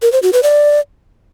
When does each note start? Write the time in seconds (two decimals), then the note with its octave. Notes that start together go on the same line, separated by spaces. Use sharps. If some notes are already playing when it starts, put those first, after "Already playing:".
0.02 A#4
0.12 C5
0.23 F#4
0.33 B4
0.43 D5